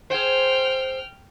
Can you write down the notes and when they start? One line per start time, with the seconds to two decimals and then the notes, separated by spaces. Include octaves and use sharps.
0.10 G#4 C5 G5 F6